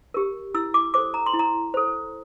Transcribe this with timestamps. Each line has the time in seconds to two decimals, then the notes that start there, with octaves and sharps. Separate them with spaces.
0.14 G4 A#4
0.54 E4 E6
0.74 D6
0.94 A4 C5 D6
1.14 A#5
1.26 C6
1.34 E4
1.39 A#5
1.74 A4 C5